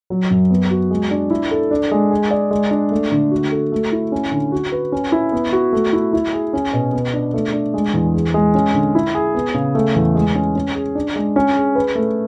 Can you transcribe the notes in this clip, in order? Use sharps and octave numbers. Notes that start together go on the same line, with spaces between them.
F#3
F#2
B3
F#4
G#3
D4
E4
A4
D4
G#3
G#4
D5
G#3
D4
A3
D3
F#4
A4
A3
E4
C#4
D3
F#4
B4
C#4
E4
B3
F#4
A3
E4
E4
G#4
C#4
B2
B3
D4
A3
D4
G#3
E2
G#4
G#3
C#4
D3
E4
G#4
B3
C#3
A3
E2
G#3
C#4
C#4
G#4
D4
G#3
C#4
G#4
B4
A3